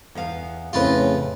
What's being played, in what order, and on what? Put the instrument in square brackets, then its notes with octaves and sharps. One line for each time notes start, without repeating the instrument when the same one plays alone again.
[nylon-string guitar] E2 B3 F5
[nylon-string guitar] F2 C4 [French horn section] A2 C#3 [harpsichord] F4 B4